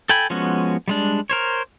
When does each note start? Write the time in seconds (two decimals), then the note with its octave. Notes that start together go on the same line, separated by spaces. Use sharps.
0.09 A4 G5 G#5 B5
0.30 F3 G#3 B3 C#4 F#4
0.88 G3 G#3 D4
1.30 A#4 C5 C#5